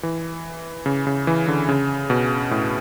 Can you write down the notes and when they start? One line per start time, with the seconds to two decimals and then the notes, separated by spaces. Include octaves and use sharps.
0.03 E3
0.86 C#3
1.07 C#3
1.27 E3
1.48 D3
1.69 C#3
2.10 B2
2.51 A2